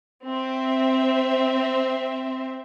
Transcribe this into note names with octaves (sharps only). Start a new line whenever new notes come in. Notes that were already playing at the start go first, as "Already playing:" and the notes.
C4 C5 E5